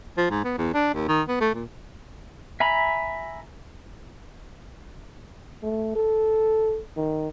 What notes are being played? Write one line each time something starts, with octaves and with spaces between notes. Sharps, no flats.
F3
G#2
B3
E2
D4
D#2
D#3
B3
A3
A#2
E5 G#5 A#5 B5
A3
A4
D#3